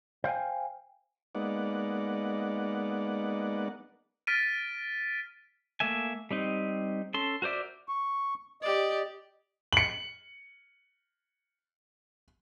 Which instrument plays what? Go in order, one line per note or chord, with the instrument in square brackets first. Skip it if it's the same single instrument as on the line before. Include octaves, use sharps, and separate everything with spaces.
[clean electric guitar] C5 F5 G5 G#5
[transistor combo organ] G#3 A#3 B3 D#4 D5 F#5
[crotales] F6 A6 B6 D7 D#7
[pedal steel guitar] A3 A#3 E5 G#5
G3 C4 D#4
C#4 A4 C6
F#4 A#4 C5 D5 E5
[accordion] C#6
[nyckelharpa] G4 D5 [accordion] D#5
[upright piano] C#7 F#7